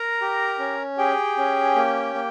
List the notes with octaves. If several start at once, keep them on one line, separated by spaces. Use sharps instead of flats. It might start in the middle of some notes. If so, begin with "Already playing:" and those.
Already playing: A#4 A#5
G4
C#4
G4 G#4 G5
C#4
A#3
A#3